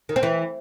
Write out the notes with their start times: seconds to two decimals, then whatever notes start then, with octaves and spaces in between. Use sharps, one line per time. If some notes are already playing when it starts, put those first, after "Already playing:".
0.09 D#3
0.16 C4
0.23 E3